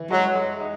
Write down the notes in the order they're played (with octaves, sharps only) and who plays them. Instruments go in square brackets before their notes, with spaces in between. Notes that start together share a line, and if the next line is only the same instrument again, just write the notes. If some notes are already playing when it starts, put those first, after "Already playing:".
Already playing: [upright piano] E3
[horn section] F#3 [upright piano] G#3
[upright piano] G#3
D#4